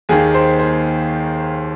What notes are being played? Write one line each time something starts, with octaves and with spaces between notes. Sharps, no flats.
D#2 D#3 A#3 G#4
C5
C5